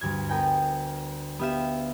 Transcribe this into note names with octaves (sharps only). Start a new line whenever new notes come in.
D2 G2 G#6
B3 A#4 G5 G#5
B3 G4 E5 F5 E7